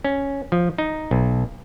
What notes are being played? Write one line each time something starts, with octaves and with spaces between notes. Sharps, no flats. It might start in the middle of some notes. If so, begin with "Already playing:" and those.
C#4
F3
D#4
B1